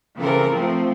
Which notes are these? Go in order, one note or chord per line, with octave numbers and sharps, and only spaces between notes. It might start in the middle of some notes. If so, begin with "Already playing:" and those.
C#3 E3 C4 A4 A#4
F3 A3 C4